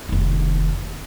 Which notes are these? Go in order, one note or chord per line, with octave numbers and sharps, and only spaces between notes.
F1 D#3